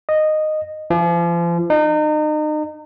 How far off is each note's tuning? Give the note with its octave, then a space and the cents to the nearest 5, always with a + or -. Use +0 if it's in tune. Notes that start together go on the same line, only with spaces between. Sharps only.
D#5 -10
F3 -35
D#4 -35